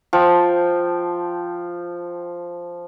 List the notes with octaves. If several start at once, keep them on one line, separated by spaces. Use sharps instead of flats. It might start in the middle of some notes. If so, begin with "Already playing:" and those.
F3 G5